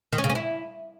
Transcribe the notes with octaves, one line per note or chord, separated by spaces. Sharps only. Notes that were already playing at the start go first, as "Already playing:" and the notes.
D#3
C#4
C#3
C#4
E4